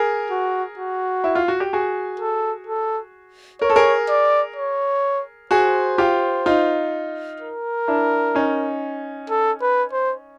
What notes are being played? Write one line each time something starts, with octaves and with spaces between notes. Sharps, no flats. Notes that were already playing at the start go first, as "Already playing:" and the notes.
Already playing: G#4 A#4
F#4
F#4
E4
F4
F#4
G4
F#4 G#4
A4
A4
A#4 C#5
A4
G#4 A#4
D5
C#5
F#4 G#4 C5
F4 G4
D#4 F4
A#4
D4 E4
C#4 D#4
A4
B4
C5